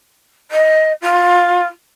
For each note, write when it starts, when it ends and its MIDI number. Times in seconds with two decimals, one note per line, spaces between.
0.51 0.92 75
1.01 1.66 65